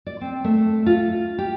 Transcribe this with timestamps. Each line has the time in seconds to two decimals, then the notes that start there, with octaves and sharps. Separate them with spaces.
0.06 D5
0.21 C4
0.44 A3
0.86 F4
1.38 G4